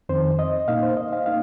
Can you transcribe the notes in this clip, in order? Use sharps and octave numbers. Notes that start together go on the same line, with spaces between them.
F2 D#3 C4 C5
D#5
A#2 A#3 D#4 F5
C5
D#5
F5
A#3 D#4 F5